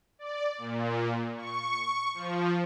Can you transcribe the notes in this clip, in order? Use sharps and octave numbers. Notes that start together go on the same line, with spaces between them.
D5
A#2
C#6
F3